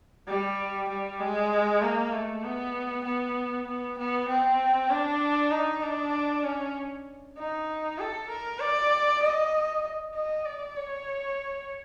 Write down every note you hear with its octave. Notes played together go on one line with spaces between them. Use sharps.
G3
G3
G#3
A#3
A3
B3
B3
B3
B3
C4
D4
D#4
D4
C#4
D#4
A4
A#4
D5
D#5
D#5
D5
C#5